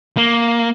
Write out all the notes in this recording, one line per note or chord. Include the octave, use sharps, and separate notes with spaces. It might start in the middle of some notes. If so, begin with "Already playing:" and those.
A#3